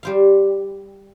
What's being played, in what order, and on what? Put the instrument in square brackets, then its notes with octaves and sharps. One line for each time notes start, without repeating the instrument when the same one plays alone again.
[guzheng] G3 C5 F5